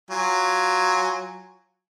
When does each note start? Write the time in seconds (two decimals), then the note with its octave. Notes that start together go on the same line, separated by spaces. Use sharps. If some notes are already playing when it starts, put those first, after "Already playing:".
0.10 F#3 F4 G#5